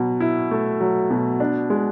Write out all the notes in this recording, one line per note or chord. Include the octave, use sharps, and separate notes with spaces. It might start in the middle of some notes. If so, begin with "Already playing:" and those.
Already playing: B2 F#3
E4
A3
F#3
B2
D4
G#3